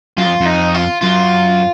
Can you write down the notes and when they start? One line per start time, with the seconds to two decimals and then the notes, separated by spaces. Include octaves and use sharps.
0.18 F#2 F4
0.26 F2
0.41 F2
0.46 D#4
0.74 F4
1.01 F#2 F4